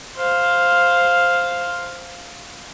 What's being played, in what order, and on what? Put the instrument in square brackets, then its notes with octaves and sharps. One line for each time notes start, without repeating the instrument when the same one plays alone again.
[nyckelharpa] C5 F5